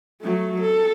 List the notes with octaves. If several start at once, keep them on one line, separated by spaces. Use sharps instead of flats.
F#3 A3
A4